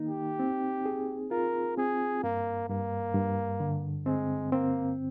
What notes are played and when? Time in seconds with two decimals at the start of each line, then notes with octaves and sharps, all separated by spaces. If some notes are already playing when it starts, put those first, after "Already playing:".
Already playing: D#3 A#3 D#4
0.09 G4
0.39 C4
0.86 G#4
1.31 F4 A#4
1.77 C4 G#4
2.23 G2 A#3
2.69 G2 A#3
3.14 G2
3.60 D3
4.06 G#3 C4
4.52 A#3 C4